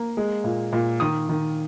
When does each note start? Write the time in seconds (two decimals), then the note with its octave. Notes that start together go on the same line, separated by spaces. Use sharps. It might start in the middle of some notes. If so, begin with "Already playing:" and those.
Already playing: A#3
0.17 G#3
0.44 A#2
0.73 A#2
1.00 D#3 D#6
1.29 D#3